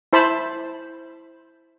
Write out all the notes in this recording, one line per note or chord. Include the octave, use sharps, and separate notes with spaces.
E4 C5 A5 B5